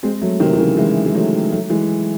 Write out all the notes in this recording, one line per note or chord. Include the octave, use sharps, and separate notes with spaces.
G#3 C4
F#3 A3
C3 D#3
D#3
C#3 E3
E3 G#3
G#3
F#3 A3
F#3 A3
E3 G#3